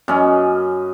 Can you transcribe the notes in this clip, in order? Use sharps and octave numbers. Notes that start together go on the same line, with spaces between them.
F#2 C#4 D#5